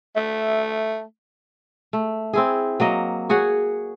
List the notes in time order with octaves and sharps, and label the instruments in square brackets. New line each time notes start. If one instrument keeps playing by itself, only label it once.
[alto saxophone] A3 [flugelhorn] E5
[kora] A3
C4 E4 G#4
F#3 A#3 D#5
F#4 G#4 C#5 F#5